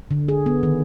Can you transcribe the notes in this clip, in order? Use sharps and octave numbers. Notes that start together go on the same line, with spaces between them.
D3
G#4
B3
D#3